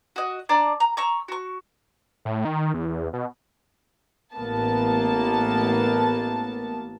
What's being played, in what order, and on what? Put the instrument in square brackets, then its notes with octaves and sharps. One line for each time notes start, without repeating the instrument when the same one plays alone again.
[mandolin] F#4 D#5
D4 D5 A5 A#5
A#5
A#5 C#6 E6
F#4 C#6
[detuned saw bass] A2
D#3
E2
B2
[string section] A1 A#3 B3 A5